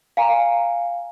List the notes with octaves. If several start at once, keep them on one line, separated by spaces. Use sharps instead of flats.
D5 F5 G#5 A#5